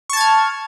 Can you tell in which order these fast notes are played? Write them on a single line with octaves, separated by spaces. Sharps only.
C#6 A5 G#6 F6